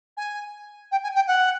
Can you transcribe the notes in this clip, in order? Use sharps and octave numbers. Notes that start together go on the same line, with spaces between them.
G#5
G5
G#5
G5
F#5